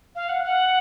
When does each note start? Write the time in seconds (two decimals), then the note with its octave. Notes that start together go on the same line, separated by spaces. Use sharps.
0.15 F5
0.29 F#5
0.44 F#5